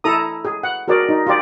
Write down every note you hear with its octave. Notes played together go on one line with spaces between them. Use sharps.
E4 A4 A#5 D#6
G#4
F#5
F#4 G#4 A#4 D5
D#4
F4 G4 D5